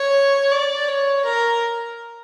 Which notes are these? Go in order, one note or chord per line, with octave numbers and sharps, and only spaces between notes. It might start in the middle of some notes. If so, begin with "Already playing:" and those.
Already playing: C#5
D5
C#5
A#4